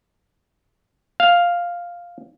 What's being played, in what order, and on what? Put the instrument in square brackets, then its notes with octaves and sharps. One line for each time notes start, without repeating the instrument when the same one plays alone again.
[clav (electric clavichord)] F5